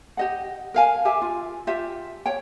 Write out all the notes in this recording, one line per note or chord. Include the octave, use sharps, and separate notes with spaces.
G4 D#5 F#5
A#4 F5 G#5
G4 E5 G#5
F4
F4 G4 E5
C#5 G5